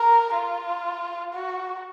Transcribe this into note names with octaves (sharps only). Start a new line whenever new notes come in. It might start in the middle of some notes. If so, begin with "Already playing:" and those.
Already playing: A#4
F4
F#4